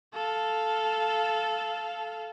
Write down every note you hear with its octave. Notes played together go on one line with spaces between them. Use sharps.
A4 F5